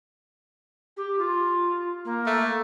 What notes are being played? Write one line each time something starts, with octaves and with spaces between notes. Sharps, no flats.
G4
F4
A#3
A3